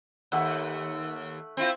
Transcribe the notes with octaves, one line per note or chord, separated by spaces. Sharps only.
D#2 A3 E5 F#5
C4 E4 F4